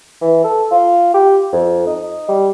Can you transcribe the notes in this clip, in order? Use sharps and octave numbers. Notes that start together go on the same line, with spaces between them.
E3
A4
F4
G4
F2
D#4
G3